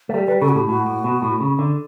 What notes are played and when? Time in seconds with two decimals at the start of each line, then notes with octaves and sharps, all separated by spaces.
0.09 A3
0.14 G3 A4
0.27 G3 B4
0.41 C#3 A4
0.49 F#4
0.55 A2 G4
0.68 A2 F#4
0.86 A2
1.04 B2
1.22 A2
1.40 C#3
1.59 D3